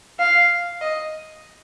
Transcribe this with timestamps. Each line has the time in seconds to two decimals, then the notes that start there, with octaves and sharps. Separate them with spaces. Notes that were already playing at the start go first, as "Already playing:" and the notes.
0.20 F5
0.81 D#5